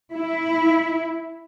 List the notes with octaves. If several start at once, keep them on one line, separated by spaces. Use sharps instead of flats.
E4